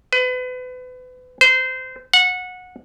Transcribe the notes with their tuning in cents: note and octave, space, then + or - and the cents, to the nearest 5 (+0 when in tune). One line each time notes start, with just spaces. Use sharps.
B4 +35
C5 -25
F#5 -20